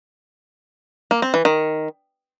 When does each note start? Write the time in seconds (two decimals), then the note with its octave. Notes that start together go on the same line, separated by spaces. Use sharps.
1.11 A#3
1.22 C4
1.34 E3
1.45 D#3